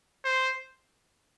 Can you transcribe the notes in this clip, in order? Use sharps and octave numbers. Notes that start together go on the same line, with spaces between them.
C5